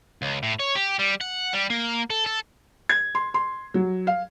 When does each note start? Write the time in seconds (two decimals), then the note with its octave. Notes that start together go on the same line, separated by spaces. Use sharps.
0.22 C#2
0.43 A2
0.60 C#5
0.76 G4
0.99 G3
1.21 F#5
1.53 G3
1.70 A#3
2.10 A4
2.26 A4
2.89 G#6
3.15 C6
3.34 C6
3.74 F#3
4.07 F5